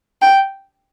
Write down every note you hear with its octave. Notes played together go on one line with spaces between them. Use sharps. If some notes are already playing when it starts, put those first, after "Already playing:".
G5